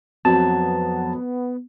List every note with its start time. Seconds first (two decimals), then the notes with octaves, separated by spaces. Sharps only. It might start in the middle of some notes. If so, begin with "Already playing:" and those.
0.25 F2 F#3 B3 C4 F#4 A5